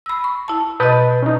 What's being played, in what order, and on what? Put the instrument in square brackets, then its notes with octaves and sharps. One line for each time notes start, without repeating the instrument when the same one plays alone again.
[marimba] B5 E6
C#6
E4 A5
[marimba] B2 D#5 [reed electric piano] B4 A5 G6
[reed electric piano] C#4 D#4